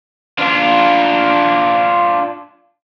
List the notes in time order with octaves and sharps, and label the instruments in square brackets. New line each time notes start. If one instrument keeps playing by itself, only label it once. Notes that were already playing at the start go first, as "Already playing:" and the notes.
[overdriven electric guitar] D4 F4